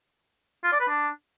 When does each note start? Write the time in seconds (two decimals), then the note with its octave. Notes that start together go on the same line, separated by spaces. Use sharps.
0.64 F4
0.72 D5
0.80 B4
0.88 D4